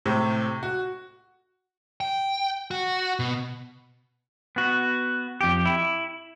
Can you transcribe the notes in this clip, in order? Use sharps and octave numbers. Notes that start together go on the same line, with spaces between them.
A2 C3
F#4
G5
F#4
B2
B3 F#4
F2 G4
E4